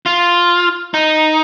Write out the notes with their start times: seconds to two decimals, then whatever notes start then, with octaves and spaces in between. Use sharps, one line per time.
0.06 F4
0.94 D#4